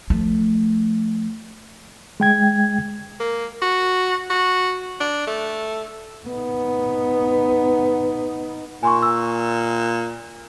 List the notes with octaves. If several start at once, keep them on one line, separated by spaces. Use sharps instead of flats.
F3 A3
G#3 G5 G#6
A#3
F#4
F#4
D4
A3
B3 D#4
A#2 G#5 C6 C#6
E6